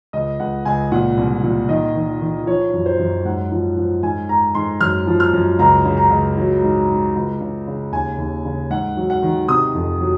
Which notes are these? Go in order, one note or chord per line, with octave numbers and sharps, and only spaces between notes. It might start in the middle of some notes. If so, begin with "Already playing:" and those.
C#2 D#5
C#2 F#5
C#2 G#5
A#2 F#5
C2
A#2
D#3 D#5
D#3
D#3
F3 C#5
F#2
C5
F#2
G#2 F#5
F3
F3
G#2 G#5
G#2 A#5
G#2 C6
F#2 F6
F3
F6
F#2
C#2 A#5
C#3
A#5
C#2
F#3
G#2
G#2
C#2
C#3
C#3
D#2 G#5
D#2
C#3
G#2 F#5
F#3
F#5
D#3
C3 D#6
F2
F#3